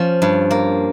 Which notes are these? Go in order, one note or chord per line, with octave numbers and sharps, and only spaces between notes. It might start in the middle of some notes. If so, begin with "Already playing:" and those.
Already playing: F3 C#4
G2
A#3